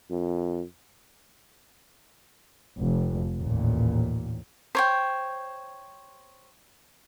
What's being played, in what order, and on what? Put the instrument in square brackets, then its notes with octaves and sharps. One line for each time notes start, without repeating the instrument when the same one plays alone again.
[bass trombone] F2
[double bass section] F1
A1 D#2 A#2
[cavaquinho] C5 C#5 G5